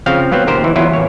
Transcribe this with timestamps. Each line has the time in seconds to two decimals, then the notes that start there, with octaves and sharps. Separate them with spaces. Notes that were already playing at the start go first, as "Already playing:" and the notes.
0.06 C#3 F3 C4 F5
0.32 F#3 B3 C4
0.47 A#2 D#3 G4 A#4 C5
0.64 E3
0.76 E2 F#3 E4 F4
0.93 A1 C#5